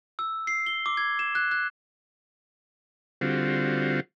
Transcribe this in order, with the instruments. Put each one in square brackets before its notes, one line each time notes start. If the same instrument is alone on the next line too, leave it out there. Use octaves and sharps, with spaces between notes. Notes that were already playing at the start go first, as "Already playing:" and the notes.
[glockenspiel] E6
C7
G7
D6
G#6
E7
F#6
F#6
[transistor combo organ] D3 G3 C4 F4 F#4